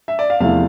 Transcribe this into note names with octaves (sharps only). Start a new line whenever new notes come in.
E5
D5
F5
E2 C3 F3 A3 E4 F5